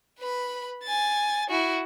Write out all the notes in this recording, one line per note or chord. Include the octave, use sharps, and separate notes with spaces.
B4 B5
G#5 A6
E4 F#4